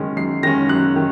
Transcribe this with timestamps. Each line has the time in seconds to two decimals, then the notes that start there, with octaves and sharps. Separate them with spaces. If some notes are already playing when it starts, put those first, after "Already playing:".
Already playing: F#2 D#3 G#3 C#4
0.17 F#2 C7
0.43 D#3 G#3 C#4 A#6
0.69 F#2 F#6
0.96 D#3